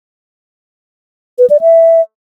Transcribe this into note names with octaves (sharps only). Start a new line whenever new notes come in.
B4
D5
E5